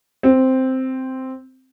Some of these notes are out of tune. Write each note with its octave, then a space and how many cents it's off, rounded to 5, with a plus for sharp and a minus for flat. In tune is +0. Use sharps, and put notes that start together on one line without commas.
C4 -5